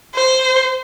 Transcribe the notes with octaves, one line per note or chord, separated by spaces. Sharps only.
C5